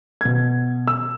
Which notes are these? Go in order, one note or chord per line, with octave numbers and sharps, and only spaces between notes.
B2 G#6
E6